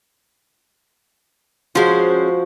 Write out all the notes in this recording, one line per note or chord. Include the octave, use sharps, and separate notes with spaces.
F3 G#3 C#4 F#4 C5